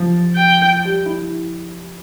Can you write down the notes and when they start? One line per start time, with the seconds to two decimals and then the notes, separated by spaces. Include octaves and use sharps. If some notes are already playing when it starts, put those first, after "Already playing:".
Already playing: F3
0.36 G5
0.84 G3
1.06 E4